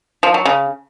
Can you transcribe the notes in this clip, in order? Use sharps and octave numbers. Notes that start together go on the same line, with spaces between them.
F3
F#3
C#3